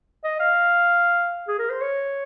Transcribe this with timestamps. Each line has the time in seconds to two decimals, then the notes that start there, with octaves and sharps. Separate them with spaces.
0.24 D#5
0.40 F5
1.48 G#4
1.59 A#4
1.70 C5
1.81 C#5